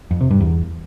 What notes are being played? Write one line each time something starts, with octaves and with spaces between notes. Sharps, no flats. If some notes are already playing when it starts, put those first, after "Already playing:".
F2
C3
G2
E2